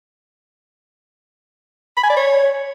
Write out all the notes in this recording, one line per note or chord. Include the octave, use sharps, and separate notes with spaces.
B5
G#5
D5
C#5